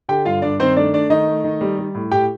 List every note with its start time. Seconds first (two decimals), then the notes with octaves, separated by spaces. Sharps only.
0.09 D3 G4 G5
0.25 G2 F4 F5
0.42 G2 D4 D5
0.60 D#3 C4 C5
0.76 A3 D4 D5
0.93 A3 D4 D5
1.10 D#3 D#4 D#5
1.27 A3
1.44 D#3
1.61 G3
1.78 G3
1.95 A2
2.11 A2 G4 G5